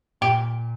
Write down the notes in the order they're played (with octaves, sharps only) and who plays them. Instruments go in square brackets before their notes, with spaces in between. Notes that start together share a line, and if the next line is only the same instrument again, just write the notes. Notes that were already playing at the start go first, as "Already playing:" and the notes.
[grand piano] A#2 [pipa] G4